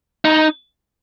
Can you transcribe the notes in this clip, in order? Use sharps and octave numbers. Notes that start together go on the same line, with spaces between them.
D#4